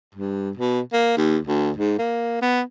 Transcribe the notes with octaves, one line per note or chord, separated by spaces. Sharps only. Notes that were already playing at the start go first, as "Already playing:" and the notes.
G2
B2
A#3
D#2
D2
G#2
A#3
B3